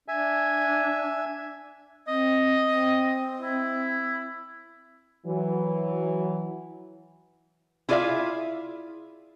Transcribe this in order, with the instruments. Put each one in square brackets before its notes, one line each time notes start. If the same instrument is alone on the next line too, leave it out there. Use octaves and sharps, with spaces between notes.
[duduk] D4 [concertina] E5 G#5
[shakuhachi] C4 [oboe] D#5
[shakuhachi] C4
[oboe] E4
[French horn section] E3 F#3
[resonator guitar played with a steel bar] E4 F4 G#4 D5 E5 F5